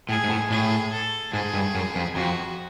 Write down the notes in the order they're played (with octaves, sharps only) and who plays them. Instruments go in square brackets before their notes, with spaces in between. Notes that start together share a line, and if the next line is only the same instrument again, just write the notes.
[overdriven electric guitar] A2 [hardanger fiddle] G#4
[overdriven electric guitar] G#2
A2
[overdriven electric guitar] A2 [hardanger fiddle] G#4
[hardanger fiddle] A4
[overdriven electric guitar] G#2 [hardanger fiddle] G#4
[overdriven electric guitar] G2
F#2
F2
[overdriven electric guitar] F2 [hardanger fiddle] F#4